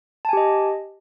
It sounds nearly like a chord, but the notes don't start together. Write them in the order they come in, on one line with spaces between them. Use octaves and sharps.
A5 G#5 G4 D#5